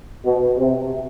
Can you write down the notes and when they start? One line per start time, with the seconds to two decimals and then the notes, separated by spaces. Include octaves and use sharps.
0.24 B2
0.57 C3